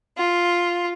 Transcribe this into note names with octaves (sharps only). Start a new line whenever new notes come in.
F4